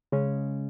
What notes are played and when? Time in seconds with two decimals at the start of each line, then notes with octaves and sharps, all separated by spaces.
0.12 C#3 G#3 C#4